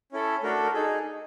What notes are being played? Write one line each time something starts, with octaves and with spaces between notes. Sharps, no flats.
C#4 E4 A4
A3 D4 F#4 A4 A#4
A#4
D#4 G#4 A4